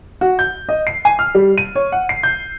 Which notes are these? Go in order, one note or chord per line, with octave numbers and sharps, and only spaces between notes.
F#4
G6
D#5
C7
G#5
F6
G3
D#7
C#5
F#5
C7
G6